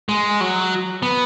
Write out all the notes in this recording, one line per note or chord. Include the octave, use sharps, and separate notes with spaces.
G#3
F#3
B3